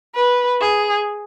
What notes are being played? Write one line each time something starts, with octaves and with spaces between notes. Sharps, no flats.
B4
G#4